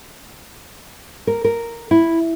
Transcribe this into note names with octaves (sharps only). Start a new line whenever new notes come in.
A#4
A#4
E4